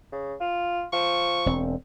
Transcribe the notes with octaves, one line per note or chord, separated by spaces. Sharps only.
C#3
F4
F3 C#6
E1 C4